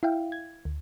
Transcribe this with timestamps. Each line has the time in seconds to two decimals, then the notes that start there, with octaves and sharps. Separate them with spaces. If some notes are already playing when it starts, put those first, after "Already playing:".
0.03 E4 E5 F5 G5
0.32 G#6
0.65 D2